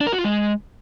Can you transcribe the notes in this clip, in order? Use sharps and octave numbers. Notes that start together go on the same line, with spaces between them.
D4
A#4
F#4
F4
G#3